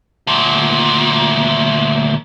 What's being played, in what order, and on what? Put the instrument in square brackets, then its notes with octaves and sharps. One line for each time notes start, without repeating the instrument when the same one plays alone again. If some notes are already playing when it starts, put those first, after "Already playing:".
[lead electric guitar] D2 A#2